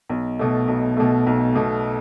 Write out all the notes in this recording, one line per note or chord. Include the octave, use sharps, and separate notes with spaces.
B1
B2 A3
B1
B2 A3
B1
B2 A3